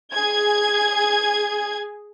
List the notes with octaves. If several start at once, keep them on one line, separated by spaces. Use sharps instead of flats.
G#4 G#6